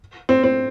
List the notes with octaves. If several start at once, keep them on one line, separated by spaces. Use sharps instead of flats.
C4
C4